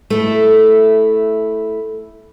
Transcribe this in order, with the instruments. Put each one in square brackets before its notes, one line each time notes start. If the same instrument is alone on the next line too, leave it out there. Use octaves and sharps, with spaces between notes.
[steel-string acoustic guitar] A3 E4